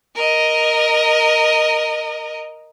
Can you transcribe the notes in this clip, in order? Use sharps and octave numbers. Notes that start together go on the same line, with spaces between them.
A#4 D#5